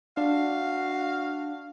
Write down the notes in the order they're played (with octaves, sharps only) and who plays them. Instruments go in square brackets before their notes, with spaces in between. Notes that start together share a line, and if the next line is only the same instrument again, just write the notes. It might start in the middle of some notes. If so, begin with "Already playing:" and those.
[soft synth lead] D4 [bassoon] F#4 [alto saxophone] F5